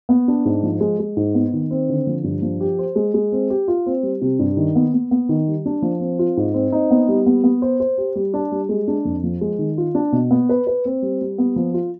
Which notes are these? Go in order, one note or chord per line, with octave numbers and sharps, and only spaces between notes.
B3
D4
G#2
F3
G#3
G#3
G#2
B3
D#3
C4
D3
F3
G2
F3
G4
C5
G#3
G#3
C4
G4
F4
C4
G3
C3
G2
D#3
B3
B3
B3
D#3
G3
D4
F3
C4
F4
G#2
C4
D#4
B3
G3
B3
B3
C5
C5
G4
G3
D4
G3
G#3
D4
F2
F3
G#3
D#3
F4
D4
B2
B3
B4
B4
C4
G3
G3
B3
F3
F4